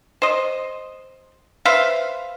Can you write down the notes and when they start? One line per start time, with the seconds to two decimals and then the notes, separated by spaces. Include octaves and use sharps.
0.22 C5 D#5
1.65 B4 C5 E5 F5